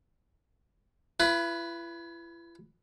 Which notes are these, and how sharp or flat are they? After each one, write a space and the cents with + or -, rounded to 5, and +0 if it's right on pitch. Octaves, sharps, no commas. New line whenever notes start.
E4 +40 B4 +0